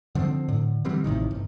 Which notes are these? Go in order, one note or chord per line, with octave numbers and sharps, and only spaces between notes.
D3 F3 G3 C4
A2 D3
D3 E3 G3 C4
A1 A2 C3 D#3
G1